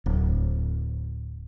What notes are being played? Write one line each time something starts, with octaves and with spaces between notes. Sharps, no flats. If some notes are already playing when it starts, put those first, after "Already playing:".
D1